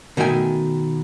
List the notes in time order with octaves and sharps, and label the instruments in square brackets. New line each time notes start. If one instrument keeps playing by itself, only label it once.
[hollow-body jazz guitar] B2 D#3 A3 G5 G#5